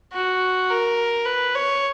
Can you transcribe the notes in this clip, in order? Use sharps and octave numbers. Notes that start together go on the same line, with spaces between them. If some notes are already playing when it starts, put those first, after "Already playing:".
F#4
A#4
B4
C#5